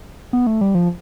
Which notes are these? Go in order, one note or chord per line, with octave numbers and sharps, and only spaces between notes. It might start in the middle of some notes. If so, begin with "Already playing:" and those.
B3
A3
G3
F3